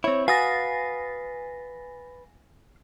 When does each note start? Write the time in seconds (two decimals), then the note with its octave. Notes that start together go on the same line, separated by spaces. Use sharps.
0.04 C4 E4 C#5
0.28 F#4 B4 F5 G#5 D#6 A6 A#6